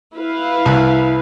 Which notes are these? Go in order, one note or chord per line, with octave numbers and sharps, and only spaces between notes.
E4 B4 F5
C2